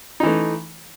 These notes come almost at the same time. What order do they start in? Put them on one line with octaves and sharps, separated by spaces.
D#4 E3 A3